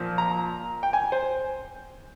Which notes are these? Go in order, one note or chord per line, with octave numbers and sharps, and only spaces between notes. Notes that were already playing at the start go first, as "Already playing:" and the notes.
Already playing: A#2 F3
A#5
G5
G#5
C5